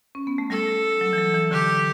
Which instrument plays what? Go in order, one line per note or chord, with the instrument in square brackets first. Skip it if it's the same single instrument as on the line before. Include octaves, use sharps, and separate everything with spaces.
[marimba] C#4
B3
A3
[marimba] G3 [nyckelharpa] A4
[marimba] F#3
E3
F#3
E3
[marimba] D3 [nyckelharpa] G4